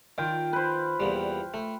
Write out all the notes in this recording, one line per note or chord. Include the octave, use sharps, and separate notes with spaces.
D#3 F4 G5
B4 C5
E2 A#2 G3
A3